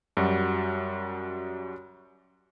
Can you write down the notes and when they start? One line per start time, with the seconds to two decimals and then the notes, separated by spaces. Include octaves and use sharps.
0.17 F#2 G3 F#4